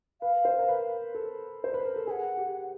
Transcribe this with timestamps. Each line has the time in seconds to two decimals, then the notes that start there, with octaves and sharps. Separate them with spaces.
0.21 B4 F5
0.45 C5
0.59 A#4
0.69 B4
1.14 A4
1.64 C5
1.74 B4
1.85 A#4
1.96 A4
2.07 G#4 F#5 G#5
2.37 G4